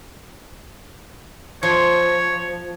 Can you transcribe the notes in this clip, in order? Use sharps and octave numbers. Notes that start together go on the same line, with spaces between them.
F3 C#5